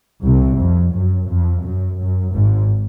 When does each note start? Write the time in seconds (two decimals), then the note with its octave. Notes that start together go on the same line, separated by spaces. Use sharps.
0.22 C2 C3
0.58 F2
0.93 F#2
1.28 F2
1.63 F#2
1.98 F#2
2.33 G#1 G#2